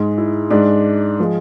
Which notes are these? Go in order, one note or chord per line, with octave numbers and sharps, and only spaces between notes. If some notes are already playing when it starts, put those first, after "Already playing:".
Already playing: G#2 G#3
E4
G#2 G#3 D4
F3 G#3